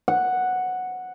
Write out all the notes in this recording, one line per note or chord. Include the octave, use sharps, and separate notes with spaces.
F#5